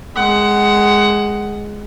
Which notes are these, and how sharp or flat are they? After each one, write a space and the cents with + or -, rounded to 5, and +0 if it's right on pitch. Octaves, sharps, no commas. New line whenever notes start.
G#3 +0 F#5 +15